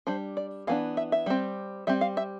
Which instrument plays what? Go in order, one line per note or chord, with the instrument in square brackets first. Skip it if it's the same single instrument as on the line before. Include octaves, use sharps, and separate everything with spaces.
[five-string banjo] G3 D4 C5
D5
E3 B3 D4 F5
E5
E5
G3 C4
G3 C4 E5
F5
E5